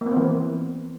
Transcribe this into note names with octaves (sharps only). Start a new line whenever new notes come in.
A#3
B3
C4
E3